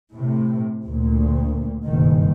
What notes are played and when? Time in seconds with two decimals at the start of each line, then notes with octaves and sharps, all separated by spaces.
0.12 A2 C3
0.85 D2 A#2
1.84 F#1 G2 B2 D#3